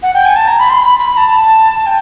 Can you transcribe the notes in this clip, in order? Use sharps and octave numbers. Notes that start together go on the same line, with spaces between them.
F#5
G5
G#5
A5
A#5
B5
C6
B5
B5
A5
G5